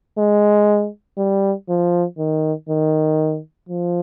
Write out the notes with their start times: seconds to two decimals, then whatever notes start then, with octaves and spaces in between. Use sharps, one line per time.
0.18 G#3
1.17 G3
1.69 F3
2.18 D#3
2.69 D#3
3.69 F3